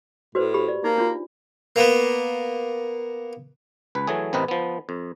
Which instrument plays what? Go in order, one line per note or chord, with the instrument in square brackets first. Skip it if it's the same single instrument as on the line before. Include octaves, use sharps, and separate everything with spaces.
[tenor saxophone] A2 [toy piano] F#4 B4 C5
[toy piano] G4 B5
D5
[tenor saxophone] A#3 [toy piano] D#4
[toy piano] D4 F4
[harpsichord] A#3 B3
[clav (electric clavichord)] C#2 B4
E3 F#3 A3 G#4
A1 C3 C4 A#4 B4 D#5
F3 B3
F2